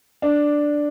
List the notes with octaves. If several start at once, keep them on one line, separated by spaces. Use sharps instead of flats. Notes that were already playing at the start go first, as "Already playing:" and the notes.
D4